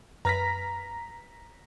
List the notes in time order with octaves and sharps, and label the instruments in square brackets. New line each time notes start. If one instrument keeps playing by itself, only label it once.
[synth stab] F#2 B4 F6 [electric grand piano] A#5 A#6 B6